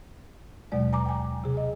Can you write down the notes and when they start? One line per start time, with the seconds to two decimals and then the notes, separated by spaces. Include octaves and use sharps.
0.72 D#2 B2 F#3 G#3 D5
0.93 G#5 A#5 D6
1.06 G5 G#5
1.44 C3 G#4
1.57 D#5